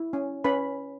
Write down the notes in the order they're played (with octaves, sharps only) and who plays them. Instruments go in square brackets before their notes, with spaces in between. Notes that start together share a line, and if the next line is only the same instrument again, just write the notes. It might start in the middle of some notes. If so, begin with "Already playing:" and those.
Already playing: [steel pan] E4
C#4
C#4 B4 B5